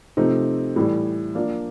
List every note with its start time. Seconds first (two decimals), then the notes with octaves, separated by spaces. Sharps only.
0.17 C3 F3 A3 C4 D#4
0.76 A2 E3 G3
1.35 F3 A#3 D4